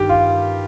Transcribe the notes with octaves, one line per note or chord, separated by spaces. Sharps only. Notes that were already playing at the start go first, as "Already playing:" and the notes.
Already playing: G2 D#3 G4
F4